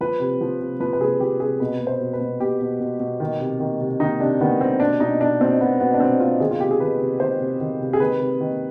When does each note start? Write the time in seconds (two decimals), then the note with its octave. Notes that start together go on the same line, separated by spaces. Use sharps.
0.01 F3 B4
0.20 C3
0.41 F3
0.60 C3
0.80 F3 B4
0.93 B4
1.00 C3 G#4
1.20 F3 G4
1.40 C3 G#4
1.60 B2 B4
1.80 B2
1.87 C5
2.00 B2
2.13 B4
2.20 B2
2.40 B2 G4
2.61 B2
2.80 B2
3.00 B2
3.20 D#3
3.40 C3
3.60 D#3
3.81 C3
4.00 D#3 D#4
4.20 C3 D4
4.41 D#3 B3
4.60 C3 C4
4.80 B2 D4
5.00 B2 D#4
5.21 B2 D4
5.41 B2 C4
5.60 B2 B3
5.80 B2 B3
5.94 D4
6.00 B2 C4
6.20 B2 F4
6.40 D#3 G#4
6.51 F4
6.60 C3 G4
6.71 G#4
6.80 D#3 B4
7.00 C3
7.20 D#3 C5
7.40 C3
7.60 D#3
7.81 C3
7.93 G#4
8.00 D#3 B4
8.21 C3
8.40 D#3